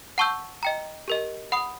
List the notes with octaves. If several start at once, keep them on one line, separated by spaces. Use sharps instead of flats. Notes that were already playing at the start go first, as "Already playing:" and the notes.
F#5 A5 C#6 E6 G6
D#5 G5 A#5
G4 A#4 D#5
F#5 B5 D#6